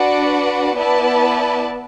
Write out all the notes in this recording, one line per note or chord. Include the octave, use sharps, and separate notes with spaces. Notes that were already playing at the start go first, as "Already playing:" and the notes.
Already playing: D4 F#4 B4 D5 F#5
B3 E4 B4 D5 A5